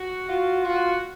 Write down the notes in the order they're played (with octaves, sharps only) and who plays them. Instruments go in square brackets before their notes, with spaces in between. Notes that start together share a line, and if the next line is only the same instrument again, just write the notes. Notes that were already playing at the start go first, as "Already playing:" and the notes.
Already playing: [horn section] F#4
[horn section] F4 [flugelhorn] F#4
[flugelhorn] F4 [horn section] F#4